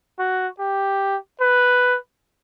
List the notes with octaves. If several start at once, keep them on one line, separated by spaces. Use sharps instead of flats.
F#4
G4
B4